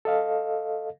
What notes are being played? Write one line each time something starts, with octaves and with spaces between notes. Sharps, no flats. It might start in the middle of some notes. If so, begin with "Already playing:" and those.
A4 D#5 F5